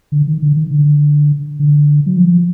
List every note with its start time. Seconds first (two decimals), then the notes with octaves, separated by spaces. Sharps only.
0.12 D3
0.27 D#3
0.42 D3
0.56 D#3
0.71 D3
1.59 D3
2.06 F#3
2.17 F3